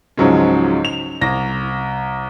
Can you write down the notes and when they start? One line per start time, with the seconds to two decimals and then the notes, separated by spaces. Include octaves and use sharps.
0.17 C#2 G#2 F3 F#3 G#3 C#4
0.85 F7
1.21 C2 A#6